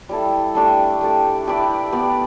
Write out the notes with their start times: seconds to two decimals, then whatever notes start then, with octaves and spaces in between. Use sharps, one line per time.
0.09 G3 E4 A4
0.55 A3 D4 G4
1.01 A3 G4 D5
1.47 E4 G4 B4 D5
1.92 B3 G4 D5